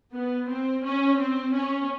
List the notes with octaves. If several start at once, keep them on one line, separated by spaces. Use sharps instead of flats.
B3
C4
C#4
C4
C#4